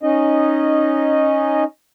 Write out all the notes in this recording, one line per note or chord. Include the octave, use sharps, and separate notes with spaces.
C#4 D#4 D#5